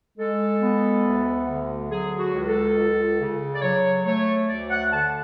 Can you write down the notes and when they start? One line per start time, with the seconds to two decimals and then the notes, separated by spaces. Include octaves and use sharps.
0.18 G#3 A4
0.61 B3
1.04 D2
1.47 D3
1.90 F#3 G#4
2.18 F#4
2.33 C#2
2.47 A4
2.76 C#2
3.19 C#3
3.55 D5
3.62 F#3 C#5
4.05 A3 C#5
4.48 D2 D5
4.70 F#5
4.91 D3 A5